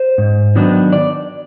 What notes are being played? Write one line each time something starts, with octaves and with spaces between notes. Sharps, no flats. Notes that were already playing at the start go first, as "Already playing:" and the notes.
Already playing: C5
G#2
D#3 F#3 B3 D4
D5